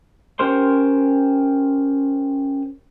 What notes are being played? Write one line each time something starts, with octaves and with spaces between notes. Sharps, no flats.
C#4 G4 A#4 C5 C6